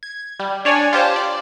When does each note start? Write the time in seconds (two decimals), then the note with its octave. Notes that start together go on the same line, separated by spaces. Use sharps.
0.03 G#6
0.40 G3
0.65 D4 C#5 D5 G#5
0.93 F4 G4 C5 A5
1.16 D5